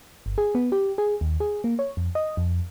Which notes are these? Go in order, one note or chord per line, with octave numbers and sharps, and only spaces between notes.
G1
G#4
B3
G4
G#4
D#2
G#4
A#3
C#5
F2
D#5
F2